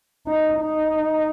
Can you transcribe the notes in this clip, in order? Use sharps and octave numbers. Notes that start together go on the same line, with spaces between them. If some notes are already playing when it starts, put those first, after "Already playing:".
D#4
D#4